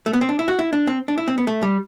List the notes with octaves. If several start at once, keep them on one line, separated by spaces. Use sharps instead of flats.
A3
B3
C4
D4
E4
F#4
E4
D4
C4
D4
E4
C4
B3
A3
G3